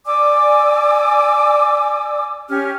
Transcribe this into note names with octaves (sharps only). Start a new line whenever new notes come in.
D5 G#5 D6 E6
C#4 G4 F6